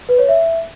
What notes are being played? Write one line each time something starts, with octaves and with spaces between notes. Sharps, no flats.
B4
C#5
E5